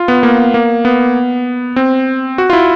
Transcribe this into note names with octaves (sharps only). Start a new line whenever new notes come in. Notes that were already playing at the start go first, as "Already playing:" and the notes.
Already playing: F4
B3
A#3
A#3
B3
C4
F#4
F4
E4